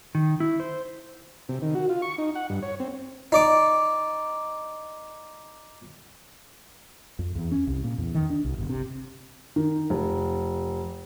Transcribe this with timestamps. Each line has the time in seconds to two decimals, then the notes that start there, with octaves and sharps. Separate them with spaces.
0.15 D#3
0.40 E4
0.60 C5
1.49 C3
1.62 D#3
1.75 F#4
1.89 F4
2.02 C#6
2.18 D#4
2.35 F#5
2.50 G2
2.62 C#5
2.80 C4
3.32 D#4 D5 D6
7.19 F2
7.35 E2
7.52 C#4
7.67 C2
7.84 A#2
7.98 E2
8.14 D#3
8.30 D4
8.45 C2
8.58 G1
8.70 C3
9.56 D#3
9.90 F1